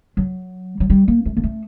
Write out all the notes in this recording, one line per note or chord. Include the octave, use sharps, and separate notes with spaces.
F#3
F#3
G3
A#3
A3
A#3
A3